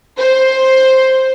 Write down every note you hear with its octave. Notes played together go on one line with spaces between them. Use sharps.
C5